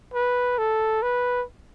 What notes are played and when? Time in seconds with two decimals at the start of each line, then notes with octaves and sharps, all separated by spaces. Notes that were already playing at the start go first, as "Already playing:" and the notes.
0.14 B4
0.58 A4
1.03 B4